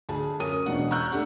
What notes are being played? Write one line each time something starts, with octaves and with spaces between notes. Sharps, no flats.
D2 G#4 A5
F#2 C#4 A#4 D#6 D#7
E1 B2 D4 F#5
A#5 C#6 E6 F#6 G6
A3 D4 G4 F#5